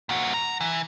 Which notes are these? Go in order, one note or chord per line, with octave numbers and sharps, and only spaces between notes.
A#2 F#4
A#5
E3